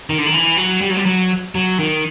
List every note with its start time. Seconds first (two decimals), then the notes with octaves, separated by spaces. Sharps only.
0.10 D#3
0.18 D3
0.26 D#3
0.34 E3
0.57 F#3
0.81 G3
0.90 F#3
0.97 G3
1.06 F#3
1.55 F#3
1.79 D#3